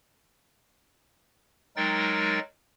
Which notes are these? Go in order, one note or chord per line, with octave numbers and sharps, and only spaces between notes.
F#3 G#3 D#4 A#4 G5 A6